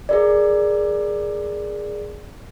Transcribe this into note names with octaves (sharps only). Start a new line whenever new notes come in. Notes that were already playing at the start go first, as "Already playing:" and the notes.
G#4 A#4 D5